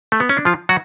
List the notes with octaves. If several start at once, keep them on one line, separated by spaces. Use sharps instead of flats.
A3
B3
C#4
D4
F3 F4
F#3 F#4